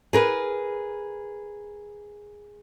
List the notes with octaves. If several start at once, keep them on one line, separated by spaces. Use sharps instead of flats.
G#4 A#4 B4